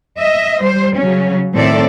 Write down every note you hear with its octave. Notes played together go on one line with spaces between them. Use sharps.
D#5 E5
G3 C5
C#3 F#3 C#4
A2 D#3 C4 A4 D5 E5